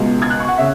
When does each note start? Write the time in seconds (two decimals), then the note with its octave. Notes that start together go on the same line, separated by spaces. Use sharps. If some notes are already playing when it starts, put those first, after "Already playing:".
Already playing: C#2 B2
0.22 G#6
0.30 F#6
0.40 C#6
0.48 F#5
0.58 C#3 E5